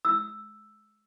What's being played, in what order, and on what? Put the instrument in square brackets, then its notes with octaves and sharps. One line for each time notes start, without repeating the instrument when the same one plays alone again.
[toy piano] E6